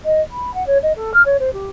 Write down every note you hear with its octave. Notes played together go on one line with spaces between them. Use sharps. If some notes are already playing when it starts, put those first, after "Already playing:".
D#5
B5
F#5
C#5
D#5
A4
F6
C#5
C5
G4